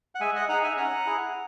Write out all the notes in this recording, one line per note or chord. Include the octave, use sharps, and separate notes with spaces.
F#5
G#3 E5 G#5
D#5 F#5
D#4 G#4 F#5 A#5
E5 G#5
C#4 F#5 A#5
E4 G#4